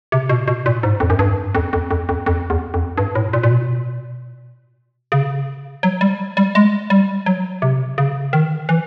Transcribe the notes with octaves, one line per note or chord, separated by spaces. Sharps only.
C3
B2
B2
A#2
G#2
F2
F#2
G2
F2
F2
F2
F2
F2
E2
F2
G2
A2
A#2
A#2
B2
C#3
F#3
G3
G3
G#3
G3
F#3
C3
C#3
D#3
E3